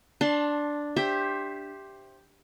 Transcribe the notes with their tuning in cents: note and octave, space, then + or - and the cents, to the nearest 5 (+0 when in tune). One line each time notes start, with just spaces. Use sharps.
D4 +0 A5 +20 C6 +25
G4 +0 C5 +20 E5 +0